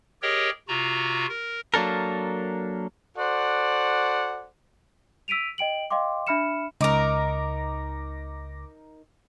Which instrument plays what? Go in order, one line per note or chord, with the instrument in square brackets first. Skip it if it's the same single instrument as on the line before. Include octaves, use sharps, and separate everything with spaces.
[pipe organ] G4 G#4 A#4 C#5 D#5 G5
C3 F4 F#4 A#5
A#4
[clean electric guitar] F#3 A#3 D4 A4 A#4
[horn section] F#4 A4 C5 D5 F#5
[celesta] E6 B6 D7 D#7 F7
D#5 G5 D7 F#7
D#5 F5 G5 C6 D6
D4 E5 B5 F6 C#7 E7
[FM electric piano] C#2 D6 A#6 [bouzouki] D#4 A#4